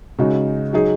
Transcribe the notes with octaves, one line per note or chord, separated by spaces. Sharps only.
C#3 G#3 D#4 F#4
F#3 D#4 G#4